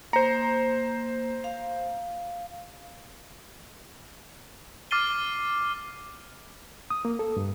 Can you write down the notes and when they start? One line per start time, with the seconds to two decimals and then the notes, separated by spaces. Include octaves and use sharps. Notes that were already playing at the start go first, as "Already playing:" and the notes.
0.13 A#3 C5 A#5
1.44 F5
4.91 D6 F6 A6 C7 D#7 G7
6.90 D#6
7.05 A#3
7.19 A4
7.37 G2